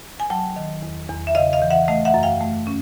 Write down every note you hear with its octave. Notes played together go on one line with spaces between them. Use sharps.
G#5
F#3 G5 A5
D#3
E2
E2
E5
C#3 D#5 F5
D#5 F5
E3
E5 F#5
A3 D#5 F5
E5 F#5
F#2
F5 G5
A3
C#4